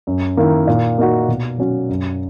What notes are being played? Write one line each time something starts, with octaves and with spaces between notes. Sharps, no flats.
F#2
D#3 A#3 E4
A#2
A#3 D#4 F#4
B2
F#3 C#4 F#4
F#2